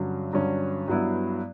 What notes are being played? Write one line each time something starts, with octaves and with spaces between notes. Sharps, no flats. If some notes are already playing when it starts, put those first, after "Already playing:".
Already playing: G2 D3 F#3 C#4
G2 D3 F#3 C#4
G2 F#3 B3 E4